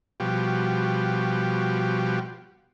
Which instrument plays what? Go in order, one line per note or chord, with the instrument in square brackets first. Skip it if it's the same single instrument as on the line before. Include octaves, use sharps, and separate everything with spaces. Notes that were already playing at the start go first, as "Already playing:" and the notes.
[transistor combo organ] B2 F3 G3 F#4 G4